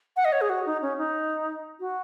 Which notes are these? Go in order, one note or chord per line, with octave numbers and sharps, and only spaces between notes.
F#5
D#5
C#5
G#4
F#4
D#4
C#4
D#4
F#4